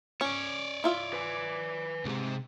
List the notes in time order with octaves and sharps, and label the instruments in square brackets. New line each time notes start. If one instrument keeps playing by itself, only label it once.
[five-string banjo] C#4 [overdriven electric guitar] C#5 D5
[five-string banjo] E4 F4 E5
[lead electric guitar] B4 G#5
[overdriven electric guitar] C#2 C3 [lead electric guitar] G#2